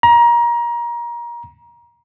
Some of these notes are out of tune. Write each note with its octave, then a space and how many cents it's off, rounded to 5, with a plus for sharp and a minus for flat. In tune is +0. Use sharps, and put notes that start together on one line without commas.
A#5 +25